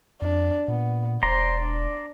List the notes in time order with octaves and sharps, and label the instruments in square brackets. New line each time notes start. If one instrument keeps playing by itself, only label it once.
[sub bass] F2 [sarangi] D4
[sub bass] A#2 [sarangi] B3
[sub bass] E1 [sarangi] C5 [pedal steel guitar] D5 A#5 C6
[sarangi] D4